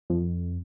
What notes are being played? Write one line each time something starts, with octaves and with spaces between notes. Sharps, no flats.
F2